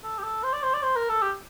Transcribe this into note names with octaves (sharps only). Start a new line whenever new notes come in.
A4
G4
A4
C5
D5
C5
D5
C5
A#4
A4
G4